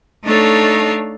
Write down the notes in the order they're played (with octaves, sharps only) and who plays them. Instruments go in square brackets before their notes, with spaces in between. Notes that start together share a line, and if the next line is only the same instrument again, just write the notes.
[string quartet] A3 D4 D#4 A4 C#5 F5